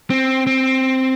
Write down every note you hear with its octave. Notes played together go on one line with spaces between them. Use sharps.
C4
C4